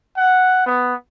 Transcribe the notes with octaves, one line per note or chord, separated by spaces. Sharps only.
F#5
B3